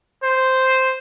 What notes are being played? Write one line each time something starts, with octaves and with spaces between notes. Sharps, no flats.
C5